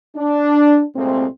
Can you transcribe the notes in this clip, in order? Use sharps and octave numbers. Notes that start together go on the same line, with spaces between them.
D4
C2 A#2 G#3 A3 C4